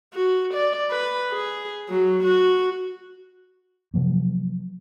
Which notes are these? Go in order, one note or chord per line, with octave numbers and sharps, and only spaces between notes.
F#4
D5
B4
G#4
F#3
F#4
C3 F3 F#3 A#3